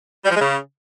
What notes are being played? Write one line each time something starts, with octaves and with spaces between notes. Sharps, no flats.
G3
F3
G#3
C#3